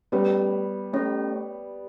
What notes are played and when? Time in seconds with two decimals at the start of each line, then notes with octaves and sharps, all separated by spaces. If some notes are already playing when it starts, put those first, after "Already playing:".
0.12 G3 A3 B3 C#4 G4 C#5
0.94 A3 C#4 G4 C#5